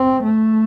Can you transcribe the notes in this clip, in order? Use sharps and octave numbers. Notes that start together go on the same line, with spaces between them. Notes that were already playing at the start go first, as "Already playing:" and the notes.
Already playing: C4
A3